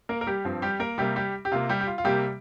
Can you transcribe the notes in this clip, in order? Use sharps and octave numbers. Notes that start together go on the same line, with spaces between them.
A#3 A#4
A#4
G3 G4
G2 F3 C4
G3 G4
A#3 A#4
C3 G3 A#3 G4
G3 G4
G4
C3 A#3 F4
G3 G4
G4
F4
F4
C3 G3 A#3 G4